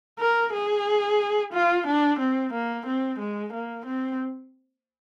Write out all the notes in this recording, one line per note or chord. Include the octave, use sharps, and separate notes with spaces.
A#4
G#4
F4
D4
C4
A#3
C4
G#3
A#3
C4